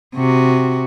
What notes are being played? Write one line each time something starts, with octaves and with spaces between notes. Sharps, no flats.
C3 F#4